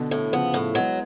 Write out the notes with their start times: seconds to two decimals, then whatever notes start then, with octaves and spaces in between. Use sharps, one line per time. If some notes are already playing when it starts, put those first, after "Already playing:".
Already playing: B2 D3
0.11 A2
0.32 C#3 F3 B3
0.54 A2
0.74 F#3 G#3 B3